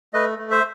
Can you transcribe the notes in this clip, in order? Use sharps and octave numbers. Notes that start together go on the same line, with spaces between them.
A3 B4 D#5
A3
C5 E5